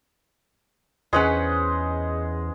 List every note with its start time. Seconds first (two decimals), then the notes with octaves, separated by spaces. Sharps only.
1.13 E2 G#3 C#4 G#4 B4 C5 F#5